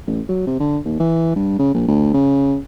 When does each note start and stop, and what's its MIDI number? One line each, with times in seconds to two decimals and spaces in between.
0.07 0.21 33
0.29 0.43 54
0.47 0.55 48
0.60 0.78 50
0.85 0.98 39
1.00 1.33 52
1.36 1.56 43
1.59 1.70 49
1.74 1.83 34
1.88 2.11 38
2.14 2.57 49